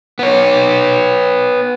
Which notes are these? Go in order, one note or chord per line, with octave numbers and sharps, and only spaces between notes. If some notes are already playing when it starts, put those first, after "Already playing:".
B3 C#5